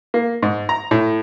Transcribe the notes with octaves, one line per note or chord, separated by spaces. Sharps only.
A#3
G#2
A#5
A2